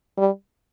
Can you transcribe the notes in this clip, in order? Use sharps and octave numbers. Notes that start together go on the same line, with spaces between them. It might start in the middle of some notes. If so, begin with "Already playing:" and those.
G3